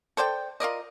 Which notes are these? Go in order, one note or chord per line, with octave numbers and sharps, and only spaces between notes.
A4 C5 D5 G5
F4 A#4 D5 D#5